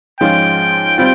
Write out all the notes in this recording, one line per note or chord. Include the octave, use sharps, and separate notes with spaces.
G#2 F3 G#3 C#4 F4 G5
G3 C4 F4